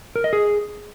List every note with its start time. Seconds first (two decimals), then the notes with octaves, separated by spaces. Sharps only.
0.16 A#4
0.24 D#5
0.33 G#4